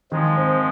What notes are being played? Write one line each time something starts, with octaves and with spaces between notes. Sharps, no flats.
D#3 F3 G#3
C4